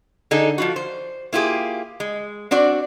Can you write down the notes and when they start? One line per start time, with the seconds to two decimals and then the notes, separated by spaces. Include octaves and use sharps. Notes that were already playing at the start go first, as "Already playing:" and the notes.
0.31 D3 D#4 G#4 A4
0.58 F3 F4 F#4
0.76 C5
1.33 A#3 E4 F4 G4 G#4
2.00 G#3
2.51 C4 D4 F#4 D5